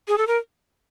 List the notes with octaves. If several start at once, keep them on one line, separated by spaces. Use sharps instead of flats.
G#4
A4
A#4